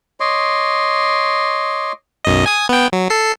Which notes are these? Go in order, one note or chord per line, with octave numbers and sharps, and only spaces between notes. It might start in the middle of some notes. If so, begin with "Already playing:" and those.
C#5 D#5 C6 D6
B1 F#2 D#5
G#5 D#6
B3 G5
F#3
A4 C7